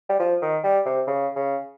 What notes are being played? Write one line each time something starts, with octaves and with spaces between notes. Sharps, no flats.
G3
F3
D#3
G3
C3
C#3
C#3